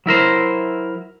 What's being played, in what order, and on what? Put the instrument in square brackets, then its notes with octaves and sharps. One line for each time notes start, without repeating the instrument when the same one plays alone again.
[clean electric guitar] F#3 E4 A#4 C5